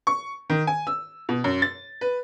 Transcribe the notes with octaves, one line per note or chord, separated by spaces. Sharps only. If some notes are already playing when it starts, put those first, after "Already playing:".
C#6
D#3
G#5
E6
B2
F#2
A6
B4